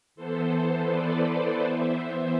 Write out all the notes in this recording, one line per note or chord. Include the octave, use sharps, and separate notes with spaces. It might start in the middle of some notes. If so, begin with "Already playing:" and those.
E3 B3 A4 C5
B4 D5
E3 B3 C5 E5